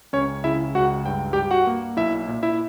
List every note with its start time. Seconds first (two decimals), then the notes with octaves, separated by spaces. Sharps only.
0.13 C#2 C#4 C#5
0.44 C#3 E4 E5
0.75 C#2 F#4 F#5
1.06 G2 G5
1.33 G2 G4 G5
1.51 F#4 F#5
1.67 A#3
1.97 B1 E4 E5
2.28 A#2
2.43 E4 E5